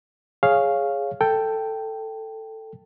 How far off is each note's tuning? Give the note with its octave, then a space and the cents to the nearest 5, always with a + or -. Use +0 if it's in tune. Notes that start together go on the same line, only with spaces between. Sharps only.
G#4 +0 C#5 +0 F5 +0
A4 +10 G5 +0